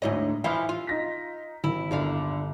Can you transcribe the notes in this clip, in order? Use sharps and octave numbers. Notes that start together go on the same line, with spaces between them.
D2 G#2 D4 E4 C#5 D#5
E3 F3 E5 F6
F4
D#4 A#6 B6
G#1 E4
G1 D#2 D3 E4 F5